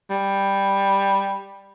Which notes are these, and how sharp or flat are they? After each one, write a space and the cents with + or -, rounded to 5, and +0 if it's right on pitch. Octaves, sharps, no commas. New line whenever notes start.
G3 +5